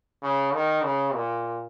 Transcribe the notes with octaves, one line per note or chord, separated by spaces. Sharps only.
C#3
D#3
C#3
A#2